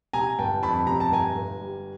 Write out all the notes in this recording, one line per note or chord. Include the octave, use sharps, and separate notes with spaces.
C3 G#5 A#5
G1 G5 A5
F2 A5 B5
C3 A#5
A5
G1 G#5 A#5
G1
G3